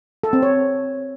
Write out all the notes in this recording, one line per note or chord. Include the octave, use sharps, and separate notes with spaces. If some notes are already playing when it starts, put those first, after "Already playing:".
A4
C4
C#5